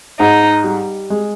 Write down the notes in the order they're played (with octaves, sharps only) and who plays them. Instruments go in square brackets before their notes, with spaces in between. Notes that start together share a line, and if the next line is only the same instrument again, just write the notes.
[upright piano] G#2 [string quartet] D#4
[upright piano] G3
G#3